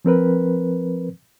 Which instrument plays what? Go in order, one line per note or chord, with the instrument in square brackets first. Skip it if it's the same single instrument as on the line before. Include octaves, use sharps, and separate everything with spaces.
[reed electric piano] F3 C4 A#4 B4